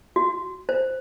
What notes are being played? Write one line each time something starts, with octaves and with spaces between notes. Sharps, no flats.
F#4
C5